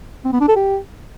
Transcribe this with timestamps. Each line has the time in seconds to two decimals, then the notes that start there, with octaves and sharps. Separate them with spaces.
0.25 C4
0.33 B3
0.40 D4
0.48 A4
0.56 G4